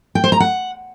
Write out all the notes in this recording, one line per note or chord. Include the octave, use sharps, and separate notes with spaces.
G5
C5
A#5
F#5